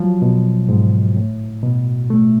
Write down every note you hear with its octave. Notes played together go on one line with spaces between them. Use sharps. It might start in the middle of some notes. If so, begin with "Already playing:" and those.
Already playing: F3 F#3
B2
G#2
A2
B2
A3